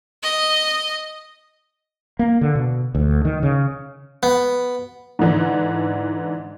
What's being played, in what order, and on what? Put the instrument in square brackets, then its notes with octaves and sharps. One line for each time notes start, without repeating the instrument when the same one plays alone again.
[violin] D#5
[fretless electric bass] A#3
D3
B2
D2
D#3
C#3
[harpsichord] B3
[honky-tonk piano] G#2 D3 E3 D4